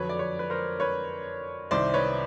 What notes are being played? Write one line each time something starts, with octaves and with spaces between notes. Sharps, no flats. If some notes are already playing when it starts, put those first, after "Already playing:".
Already playing: F2 D3 F#3 B4 C#5
D5
B4 C#5
B4
A#4 C5
B4 C#5
C2 C3 D#3 C5 D5
B4 C#5